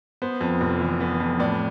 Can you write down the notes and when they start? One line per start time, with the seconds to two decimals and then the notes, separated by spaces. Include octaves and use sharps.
0.22 B3 C5
0.41 F2
0.61 F1
0.81 E3
1.00 B3
1.20 F2
1.39 A2 D5